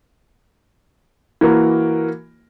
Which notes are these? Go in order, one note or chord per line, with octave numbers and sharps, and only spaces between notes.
E3 A#3 F#4 A#4